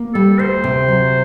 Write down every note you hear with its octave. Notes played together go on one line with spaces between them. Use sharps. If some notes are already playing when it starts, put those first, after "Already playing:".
Already playing: A#3
G3 A4
D2 C5
C3
F#3